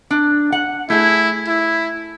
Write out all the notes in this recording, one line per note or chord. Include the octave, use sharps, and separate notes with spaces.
D4
F#5
A3 E4 G#4
E4